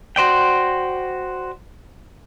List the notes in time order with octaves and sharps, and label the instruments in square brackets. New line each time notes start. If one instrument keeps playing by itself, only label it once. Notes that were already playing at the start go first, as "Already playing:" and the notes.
[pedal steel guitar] F#4 C5 D5 G5